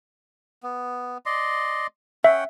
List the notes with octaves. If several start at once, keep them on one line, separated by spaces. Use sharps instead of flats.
B3
D5 D#5 C6
C#4 E5 F#5 G5